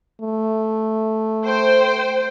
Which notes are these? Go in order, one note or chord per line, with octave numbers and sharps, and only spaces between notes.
A3
C5 G5